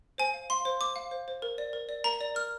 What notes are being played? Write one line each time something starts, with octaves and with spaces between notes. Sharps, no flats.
C5 G#5
F5
F5 C6
C5
C5 D6
F5
C5
C5
A#4
D5
A#4
D5
A#4 A#5
D5
A#4 F6